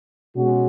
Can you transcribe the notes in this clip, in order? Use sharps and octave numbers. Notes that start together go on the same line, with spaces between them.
B2 G#3 C#4 F#4